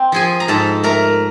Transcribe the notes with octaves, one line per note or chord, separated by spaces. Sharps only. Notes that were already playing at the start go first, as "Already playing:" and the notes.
Already playing: C4
F3 G#4 G#5
A#5
G#2 A4 A5
A3 A#4 A#5